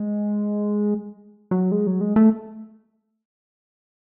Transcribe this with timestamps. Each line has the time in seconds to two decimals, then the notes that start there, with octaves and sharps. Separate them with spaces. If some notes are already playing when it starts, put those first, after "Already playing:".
Already playing: G#3
1.51 F#3
1.72 G#3
1.87 F#3
2.01 G#3
2.16 A3